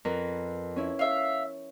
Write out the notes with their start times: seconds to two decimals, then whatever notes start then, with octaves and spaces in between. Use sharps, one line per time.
0.05 F2 A#4 B4
0.76 C#4 E4
0.99 E5 F5